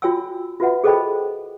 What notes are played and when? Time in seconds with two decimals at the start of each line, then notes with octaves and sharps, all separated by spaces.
0.02 F4 F#4 C#5 G5 G#5 E6
0.60 F4 F#4 B4 E5 F#5
0.84 G#4 A4 C5 D#5 G5 B5